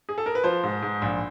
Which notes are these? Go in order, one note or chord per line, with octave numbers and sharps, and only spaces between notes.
G#4
A4
A#4
B4
F3 C5
G#2
G#2
A#1